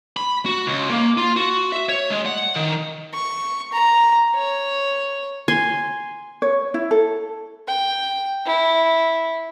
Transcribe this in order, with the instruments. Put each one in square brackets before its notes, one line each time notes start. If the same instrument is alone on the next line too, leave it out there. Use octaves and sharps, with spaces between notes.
[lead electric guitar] B5
F#4
C#2
A#3
F4
F#4
E5
C#5
G#3
F#5
D#3
[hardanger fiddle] C#6
A#5
C#5
[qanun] G#5 C6
[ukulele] C#5
E4
A4
[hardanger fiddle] G5
E4